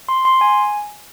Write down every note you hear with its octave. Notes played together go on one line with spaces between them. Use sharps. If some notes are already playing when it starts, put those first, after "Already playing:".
C6
C6
G#5